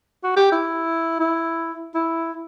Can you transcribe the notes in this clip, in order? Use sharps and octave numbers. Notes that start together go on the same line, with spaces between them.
F#4
G4
E4
E4
E4